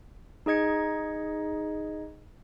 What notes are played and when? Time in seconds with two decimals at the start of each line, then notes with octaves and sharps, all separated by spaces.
0.46 D#4 G#4 D#5 G#6 C#7